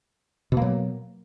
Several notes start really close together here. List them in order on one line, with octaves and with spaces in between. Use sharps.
B2 A#3 F#3